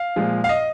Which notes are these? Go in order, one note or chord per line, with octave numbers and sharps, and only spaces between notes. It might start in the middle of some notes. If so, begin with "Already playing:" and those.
Already playing: F5
A#2 F3 G#3
F5
D#5